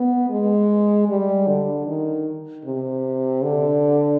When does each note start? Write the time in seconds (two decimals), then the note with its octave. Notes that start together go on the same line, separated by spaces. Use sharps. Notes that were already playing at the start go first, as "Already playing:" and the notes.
Already playing: B3
0.30 G#3
1.08 G3
1.47 D3
1.87 D#3
2.65 C3
3.43 D3